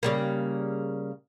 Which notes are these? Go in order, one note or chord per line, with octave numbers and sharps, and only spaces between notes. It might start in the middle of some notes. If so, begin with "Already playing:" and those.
C#3 G3 A#3